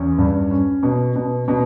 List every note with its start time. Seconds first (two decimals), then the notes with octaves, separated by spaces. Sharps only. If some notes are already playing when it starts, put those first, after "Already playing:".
Already playing: E2 C#4
0.18 G2
0.51 C#4
0.83 B2
1.16 B2
1.48 B2